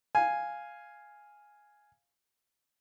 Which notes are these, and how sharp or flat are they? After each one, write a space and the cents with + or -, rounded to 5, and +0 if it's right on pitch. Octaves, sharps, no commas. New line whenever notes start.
F5 +0 G#5 +0